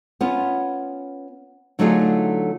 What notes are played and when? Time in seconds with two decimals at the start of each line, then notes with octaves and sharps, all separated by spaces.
0.21 B3 C#4 F4
1.79 D3 F#3 A3 D#4 F4 G#4